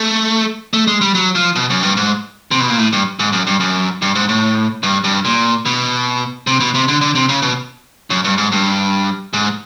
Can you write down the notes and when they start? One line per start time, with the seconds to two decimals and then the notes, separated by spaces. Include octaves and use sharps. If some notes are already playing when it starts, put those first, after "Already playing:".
Already playing: A3
0.73 A3
0.87 G#3
1.01 G3
1.15 F#3
1.35 F3
1.56 B2
1.70 F#2
1.83 G2
1.97 G#2
2.51 C3
2.60 B2
2.70 A#2
2.78 A2
2.93 G2
3.19 G#2
3.33 F#2
3.47 G2
3.60 F#2
4.02 G2
4.15 G#2
4.29 A2
4.83 G2
5.04 G2
5.25 A#2
5.66 B2
6.47 C3
6.60 B2
6.74 C3
6.88 D3
7.01 D3
7.15 C3
7.29 C#3
7.42 B2
8.10 F#2
8.24 G2
8.38 G#2
8.52 G2
9.33 G#2